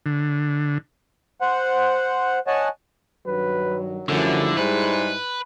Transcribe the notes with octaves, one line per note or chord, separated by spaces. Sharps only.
D3
C5 F#5
C#5 D#5 F#5 G#5 A5
G2 D#3 F#3 B4
F#2 D3 F3 G3 A3 E4
G#2 G3 G#3 B4